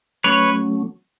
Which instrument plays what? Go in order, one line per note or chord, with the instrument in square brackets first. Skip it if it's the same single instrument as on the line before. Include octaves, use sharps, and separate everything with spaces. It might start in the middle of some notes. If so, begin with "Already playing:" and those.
[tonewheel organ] F#3 A3 C#4 [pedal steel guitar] B4 C#5